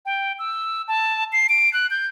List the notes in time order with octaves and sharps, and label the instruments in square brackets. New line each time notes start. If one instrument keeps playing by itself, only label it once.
[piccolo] G5
E6
A5
C7
D7
F#6
G6